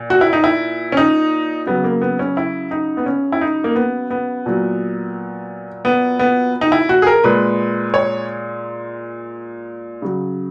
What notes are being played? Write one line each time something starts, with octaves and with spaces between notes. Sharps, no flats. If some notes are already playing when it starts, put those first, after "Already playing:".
Already playing: A#2
F#4
E4
D#4
E4
C#4
D#4
C#3 F#3 B3
A#3
B3
C#4
E4
D#4
B3
C#4
E4
D#4
A#3
B3
B3
A#2 F#3
B3
B3
D#4
E4
F#4
G#4
A#4
A#2 G#3 B4
C#5
C#3 F#3